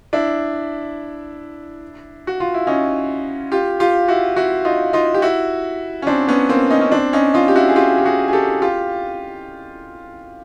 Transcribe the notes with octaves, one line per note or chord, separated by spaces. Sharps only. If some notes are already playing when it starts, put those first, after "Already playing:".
D4 E4
F#4
F4
E4
C#4 D#4
F4 G4
F4 G4
E4 F#4
E4 F#4
D#4 F4
D#4 F4
G4
E4 F#4
C#4
C4 D4
B3 C#4
A#3 C4
C#4 D#4
C#4
C4 D4
C#4 D#4
D#4 F4
G4
E4 F#4
G#4
F4 G4
G4
F#4 G#4
G#4
G4 A4
F4 G4